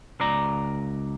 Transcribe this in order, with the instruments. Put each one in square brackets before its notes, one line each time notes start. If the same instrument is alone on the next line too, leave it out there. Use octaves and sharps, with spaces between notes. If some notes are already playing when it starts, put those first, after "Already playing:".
[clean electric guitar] C#2 D5 A#5